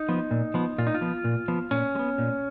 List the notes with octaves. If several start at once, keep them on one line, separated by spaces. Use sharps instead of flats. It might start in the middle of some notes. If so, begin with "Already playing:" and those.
Already playing: D#4
F3 B3
A#2
F3 B3
A#2 F4
D#4
F4
F3 B3
A#2
F3 B3
A#2 C#4
G#3
B3
A#2